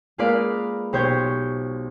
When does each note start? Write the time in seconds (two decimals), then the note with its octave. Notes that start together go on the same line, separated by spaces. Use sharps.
0.18 G#3 A#3 F4 B4 D5 F5
0.93 B1 G4 C5 C#5 G6 G#6